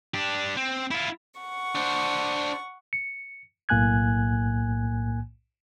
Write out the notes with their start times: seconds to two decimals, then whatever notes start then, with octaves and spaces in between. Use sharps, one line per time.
0.14 D4 G4
0.56 C4
0.91 E4 F4
1.39 F#5 C#6
1.75 D4 C5
2.93 C#7
3.69 B1 A2 A#3 G#5 F#6 G#6